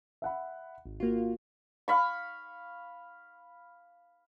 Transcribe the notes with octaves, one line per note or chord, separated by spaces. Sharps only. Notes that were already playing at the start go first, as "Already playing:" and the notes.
E5 F#5 B5
G#1
A#3 F4 F#4
F5 B5 C#6